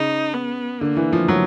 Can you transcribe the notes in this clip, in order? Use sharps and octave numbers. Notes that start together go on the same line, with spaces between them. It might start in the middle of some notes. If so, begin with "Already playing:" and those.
Already playing: C#3 D#4
B3
D3 A#3
E3
F3
F#3